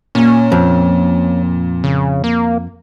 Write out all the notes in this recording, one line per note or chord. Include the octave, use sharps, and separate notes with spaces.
A#2 C#4
F2
C#3
A#3